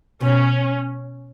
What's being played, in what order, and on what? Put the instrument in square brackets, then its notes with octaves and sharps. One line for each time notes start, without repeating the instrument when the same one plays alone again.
[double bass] B2 [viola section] C#4